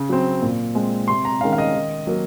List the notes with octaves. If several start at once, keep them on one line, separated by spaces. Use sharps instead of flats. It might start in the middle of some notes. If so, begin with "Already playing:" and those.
Already playing: C#3
F#3 C4
A#2
G#3 C4
C3 C6
A#5
D#3 G#3 C#4 F5
F5
D#5
D#3
F#3 A#3